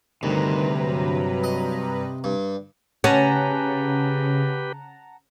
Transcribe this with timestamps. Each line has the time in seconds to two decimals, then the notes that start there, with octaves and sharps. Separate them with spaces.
0.23 D2 G2 C3 D#3 B4 A#5
0.82 F#3
1.44 D#5
2.24 G2
3.04 C#3 C#4 G4 B4 F#5 A5 A#5